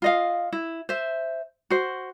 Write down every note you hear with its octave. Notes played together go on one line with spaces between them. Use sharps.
F4 D#5 F5
E4
C5 E5
F#4 C5